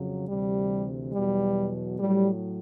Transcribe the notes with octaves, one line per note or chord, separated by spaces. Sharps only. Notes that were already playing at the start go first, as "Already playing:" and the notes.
Already playing: F2 C#3 F#3
D2 C3 E3 G3
E2 B2 F#3 G3
A2 F#3 G3